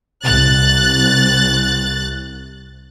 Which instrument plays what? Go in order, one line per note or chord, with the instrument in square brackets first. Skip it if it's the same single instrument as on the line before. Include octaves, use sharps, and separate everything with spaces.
[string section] C2 F#6 A6